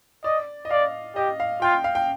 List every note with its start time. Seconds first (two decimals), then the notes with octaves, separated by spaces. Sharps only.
0.24 D5 D#5
0.65 D#5
0.71 D5 F5
1.16 G4 D#5
1.40 F5
1.62 F4 G5
1.84 F5
1.95 G5